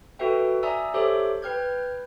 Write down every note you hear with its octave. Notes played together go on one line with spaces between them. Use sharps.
F#4 A4 B4 E5 G5
D5 E5 G#5 A#5 D#6 E6
G4 A4 C5 C#5 E5 D6
B4 G5 F6 G6 G#6